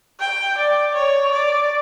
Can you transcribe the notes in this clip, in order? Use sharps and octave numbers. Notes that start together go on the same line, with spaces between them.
G5
D5
C#5
D5